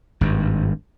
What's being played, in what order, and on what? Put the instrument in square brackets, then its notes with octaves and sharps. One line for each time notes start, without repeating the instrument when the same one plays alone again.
[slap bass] G#1 G2